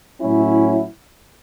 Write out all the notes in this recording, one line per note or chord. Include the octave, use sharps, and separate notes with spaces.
A2 F#3 C#4 E4